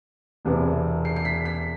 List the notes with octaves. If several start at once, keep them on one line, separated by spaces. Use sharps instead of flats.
E1 E2 C3 E3
C7
C7
B6
B6